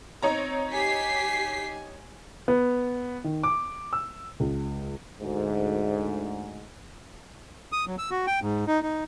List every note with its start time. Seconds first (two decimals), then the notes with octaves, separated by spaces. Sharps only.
0.22 C4 D#4 C#5 A#5
0.72 G4 G#5 B6 C7
2.48 B3
3.24 D#3
3.43 D6
3.93 E6
4.40 C#2
5.22 D2 G#2
7.72 D#6
7.87 F#3
7.98 E6
8.11 F#4
8.27 G5
8.41 G#2
8.67 D#4
8.82 D#4